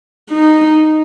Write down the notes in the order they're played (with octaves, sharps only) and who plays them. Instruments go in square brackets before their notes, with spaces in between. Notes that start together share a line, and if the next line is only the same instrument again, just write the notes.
[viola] D#4